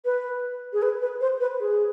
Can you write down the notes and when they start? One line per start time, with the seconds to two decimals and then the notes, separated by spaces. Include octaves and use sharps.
0.05 B4
0.73 G#4
0.82 B4
1.01 B4
1.21 C5
1.40 B4
1.60 G#4